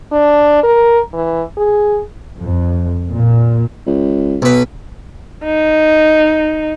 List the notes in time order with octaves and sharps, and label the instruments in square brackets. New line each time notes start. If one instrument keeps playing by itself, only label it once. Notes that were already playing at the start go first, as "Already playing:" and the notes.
[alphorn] D4
A#4
E3
G#4
[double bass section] F2
A#2
[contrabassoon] C#2
[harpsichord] B1 B4
[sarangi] D#4